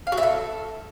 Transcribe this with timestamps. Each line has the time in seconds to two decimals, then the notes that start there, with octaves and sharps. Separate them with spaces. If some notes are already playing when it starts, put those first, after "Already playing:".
0.07 F5
0.12 F#4
0.18 E5
0.23 A4